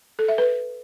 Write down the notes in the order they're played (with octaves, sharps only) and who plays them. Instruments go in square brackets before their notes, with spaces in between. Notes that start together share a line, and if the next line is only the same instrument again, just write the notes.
[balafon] A4
E5
B4